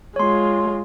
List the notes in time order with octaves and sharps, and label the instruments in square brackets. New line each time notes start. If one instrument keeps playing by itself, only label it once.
[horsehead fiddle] G#3 F4 [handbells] C#5 C6